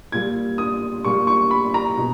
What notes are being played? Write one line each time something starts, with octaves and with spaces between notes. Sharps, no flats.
A#2 G3 G#6
D#6
A#2 G3 C#6
C#6
B5
A#5
B2